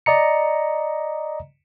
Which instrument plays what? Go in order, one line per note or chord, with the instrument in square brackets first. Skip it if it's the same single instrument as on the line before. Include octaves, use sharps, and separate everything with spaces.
[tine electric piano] D5 D#5 A#5 C#7